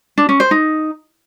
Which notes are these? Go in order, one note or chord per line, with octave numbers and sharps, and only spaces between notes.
D4
C#4
C5
D#4